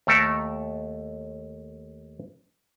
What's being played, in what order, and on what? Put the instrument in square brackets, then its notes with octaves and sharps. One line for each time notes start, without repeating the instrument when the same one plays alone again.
[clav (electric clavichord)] D#2 A3 A4 A#4